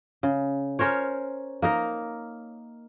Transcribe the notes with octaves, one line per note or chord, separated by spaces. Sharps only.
C#3
C#4 A#4 C5 C#5
A#3 D#4 A#4